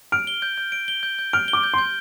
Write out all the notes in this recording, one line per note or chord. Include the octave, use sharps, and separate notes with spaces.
F6 D7
G7
G6
G6
D7
G7
G6
G6
F6 D7
G7
D6
G6
C6
G6